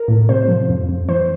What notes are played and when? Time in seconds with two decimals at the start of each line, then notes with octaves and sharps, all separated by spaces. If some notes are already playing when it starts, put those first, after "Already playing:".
Already playing: A#4
0.08 A2
0.29 C3 C5
0.48 F3
0.69 F2
0.89 F2
1.09 E3 C5